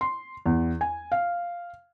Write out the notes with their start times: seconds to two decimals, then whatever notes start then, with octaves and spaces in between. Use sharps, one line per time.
0.01 C6
0.46 E2
0.81 G#5
1.12 F5